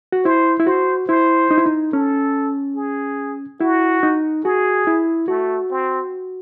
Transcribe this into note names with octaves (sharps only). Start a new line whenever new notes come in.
F#4
E4 C5
E4
F#4 C5
E4 C5
D#4
E4
D#4
C#4 A4
G#4
E4 F#4
D#4
F#4 G#4
E4
A3 F#4
C4